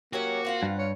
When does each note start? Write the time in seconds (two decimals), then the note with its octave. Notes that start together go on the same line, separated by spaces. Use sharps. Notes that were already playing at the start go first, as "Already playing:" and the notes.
0.13 F#3 A#3 C#4 F#4 G4
0.45 C4 F4 F#5
0.63 G2
0.78 C#5